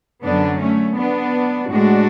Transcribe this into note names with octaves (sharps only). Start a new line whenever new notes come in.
F#2 D3 F#3 B3 D4
A3 C#4
B3 D4
A2 G#3 D4 F#4